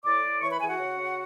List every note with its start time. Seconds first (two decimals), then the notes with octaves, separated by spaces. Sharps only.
0.04 A2 D5 D6
0.22 A2
0.41 E3 C#5 C#6
0.51 B4 B5
0.60 E3 G#4 G#5
0.69 F#4 F#5
0.79 C#3
0.97 C#3